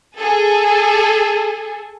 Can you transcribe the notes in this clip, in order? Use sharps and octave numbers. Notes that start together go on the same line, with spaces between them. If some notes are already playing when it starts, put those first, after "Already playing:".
G#4 A4